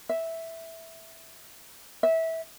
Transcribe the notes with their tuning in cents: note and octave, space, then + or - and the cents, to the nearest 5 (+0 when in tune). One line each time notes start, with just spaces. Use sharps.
E5 -5
E5 -20